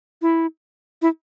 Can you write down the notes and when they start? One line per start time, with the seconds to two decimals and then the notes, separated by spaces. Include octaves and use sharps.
0.22 E4
1.02 E4